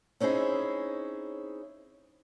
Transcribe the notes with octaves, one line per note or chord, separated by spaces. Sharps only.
C4 C#4 D#4 E4 G#4